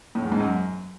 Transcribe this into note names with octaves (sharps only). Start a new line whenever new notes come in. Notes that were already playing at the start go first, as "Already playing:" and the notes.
A2
E2
G#2
F#2